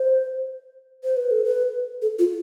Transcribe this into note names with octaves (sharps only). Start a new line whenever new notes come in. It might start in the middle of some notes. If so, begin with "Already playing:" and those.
Already playing: C5
C5
B4
A4
B4
A4
F4